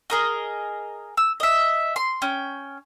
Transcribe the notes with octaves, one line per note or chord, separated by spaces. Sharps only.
G#4 A#4 D#5
E6
D#5 E5
C6
C#4 G5